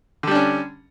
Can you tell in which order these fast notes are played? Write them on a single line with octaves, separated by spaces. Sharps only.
D3 G3 D4 C#4